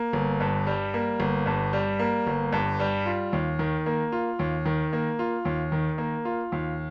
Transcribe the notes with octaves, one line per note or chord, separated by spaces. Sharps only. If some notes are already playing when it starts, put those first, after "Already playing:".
Already playing: A#3
G1
G2
G3
A#3
G1
G2
G3
A#3
G1
G2
G3
F4
D#2
D#3
A#3
F4
D#2
D#3
A#3
F4
D#2
D#3
A#3
F4
D#2